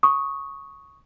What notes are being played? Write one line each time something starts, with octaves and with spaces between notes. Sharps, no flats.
C#6 D#6